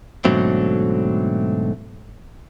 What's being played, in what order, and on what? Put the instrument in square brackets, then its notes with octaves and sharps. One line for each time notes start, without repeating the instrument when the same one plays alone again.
[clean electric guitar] G#2 B2 D3 F#3 A3 C4